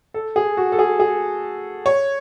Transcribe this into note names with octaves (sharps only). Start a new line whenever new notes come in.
A4
G#4
F#4
A4
G#4
G#4
C#5